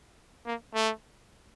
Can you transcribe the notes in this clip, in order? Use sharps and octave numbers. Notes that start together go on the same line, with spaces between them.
A#3
A3